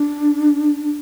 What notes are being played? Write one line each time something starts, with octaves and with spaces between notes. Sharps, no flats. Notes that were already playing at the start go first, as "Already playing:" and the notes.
Already playing: D4